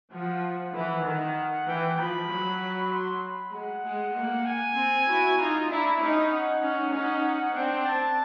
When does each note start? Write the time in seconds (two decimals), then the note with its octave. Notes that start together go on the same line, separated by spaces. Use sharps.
0.13 F3 F#5
0.44 F#5
0.75 E3 F#5
1.06 D#3
1.67 E3 G5
1.98 F3 B5
2.29 F#3
2.92 C6
3.23 B5
3.53 G#3 F#5
3.84 G#3
4.15 A#3
4.45 G#5
4.76 C4
5.07 E4 F#4
5.38 D#4 F4 A#5
5.69 D4 E4 A#5
6.00 C#4 D#4 B5
6.31 F#5
6.62 C#4 D#4
6.92 C#4 D#4
7.54 C4 D4 G5
7.85 A5